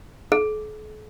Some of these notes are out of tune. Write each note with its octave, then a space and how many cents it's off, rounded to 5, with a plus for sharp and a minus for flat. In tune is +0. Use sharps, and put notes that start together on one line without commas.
A4 -45